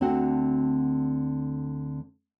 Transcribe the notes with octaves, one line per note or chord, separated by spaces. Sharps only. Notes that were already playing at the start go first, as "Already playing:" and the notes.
D2 D3 C4 F#4 F#5